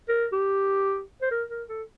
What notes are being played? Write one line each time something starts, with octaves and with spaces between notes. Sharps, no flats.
A#4
G4
C5
A#4
A#4
A4